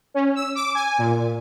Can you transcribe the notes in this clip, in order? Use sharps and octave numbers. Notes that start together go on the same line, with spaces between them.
C#4
E6
D6
G#5
A#2